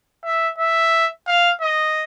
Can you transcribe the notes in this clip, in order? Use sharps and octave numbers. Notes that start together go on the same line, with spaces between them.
E5
E5
F5
D#5